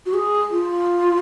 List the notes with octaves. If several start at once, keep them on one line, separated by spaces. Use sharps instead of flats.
F#4
G#4
F4